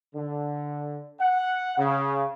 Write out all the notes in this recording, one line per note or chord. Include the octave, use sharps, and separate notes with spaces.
D3
F#5
C#3